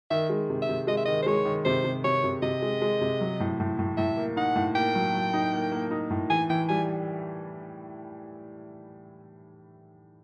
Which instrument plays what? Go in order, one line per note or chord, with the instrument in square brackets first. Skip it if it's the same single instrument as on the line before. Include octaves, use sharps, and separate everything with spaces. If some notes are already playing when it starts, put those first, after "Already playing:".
[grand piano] D#3 [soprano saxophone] E5
[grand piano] G#3
C3
[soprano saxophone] E5
[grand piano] C3
[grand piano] G#3 [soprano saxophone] D#5
[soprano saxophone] E5
[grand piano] D#3 [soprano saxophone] D#5
[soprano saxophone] C5
[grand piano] G#3 [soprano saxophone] C#5
[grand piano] D#3
[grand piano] C3 [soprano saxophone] C5
[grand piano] C3
[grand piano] C3 [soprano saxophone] C#5
[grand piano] C3
[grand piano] C3 [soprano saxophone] D#5
[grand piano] G#3
G#3
C3
F#3
A2
A2
A2
[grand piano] A2 [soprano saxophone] E5
[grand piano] A#3
[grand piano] D#4 [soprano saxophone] F#5
[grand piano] A2
[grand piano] A#3 [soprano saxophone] G5
[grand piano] F#3
F#3
D#4
A#3
A#3
D#4
A2
[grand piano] E3 [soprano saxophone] G#5
[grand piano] E3 [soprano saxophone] G5
[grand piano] G3 [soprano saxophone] G#5